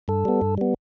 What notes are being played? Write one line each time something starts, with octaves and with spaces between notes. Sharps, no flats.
G2 A4
G3 B3
G2
G3 B3